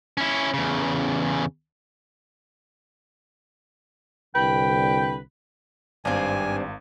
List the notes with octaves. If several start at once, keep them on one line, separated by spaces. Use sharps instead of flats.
C#4 E4
E2 C#3
C2 D3 B4 G5
G#1 G2 C4 D4 F5 G#5